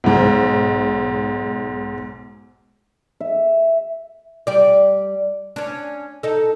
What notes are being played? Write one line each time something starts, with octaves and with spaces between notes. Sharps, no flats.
B1 G#2
E5
G3 D5
C#4 D4
D#4 A4